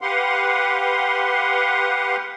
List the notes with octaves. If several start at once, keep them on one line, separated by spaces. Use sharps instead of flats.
G4 B4 F5 F#5 C6